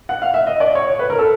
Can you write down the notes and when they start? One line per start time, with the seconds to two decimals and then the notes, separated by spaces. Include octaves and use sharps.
0.09 F#5
0.22 F5
0.34 E5
0.47 D#5
0.60 D5
0.75 C#5
0.90 C#5
0.99 B4
1.10 A#4
1.18 A4